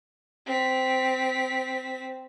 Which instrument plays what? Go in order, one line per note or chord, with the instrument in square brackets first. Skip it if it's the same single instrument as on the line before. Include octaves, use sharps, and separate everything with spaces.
[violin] C4 B6